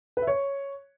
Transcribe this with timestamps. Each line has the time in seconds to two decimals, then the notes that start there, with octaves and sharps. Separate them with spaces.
0.17 B4
0.22 E5
0.27 C#5